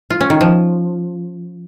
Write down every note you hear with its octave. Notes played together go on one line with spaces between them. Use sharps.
F4
C#4
D#3
F3